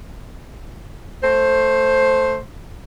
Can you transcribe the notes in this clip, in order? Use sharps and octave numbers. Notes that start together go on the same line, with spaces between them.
A3 C5